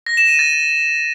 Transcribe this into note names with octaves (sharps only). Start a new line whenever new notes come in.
A#6
E7
D#7
A6